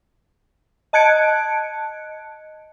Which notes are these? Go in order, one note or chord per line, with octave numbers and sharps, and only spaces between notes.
D#5 A5 F#6 G#6 C#7 D7